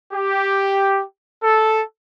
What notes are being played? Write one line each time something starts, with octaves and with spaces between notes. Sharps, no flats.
G4
A4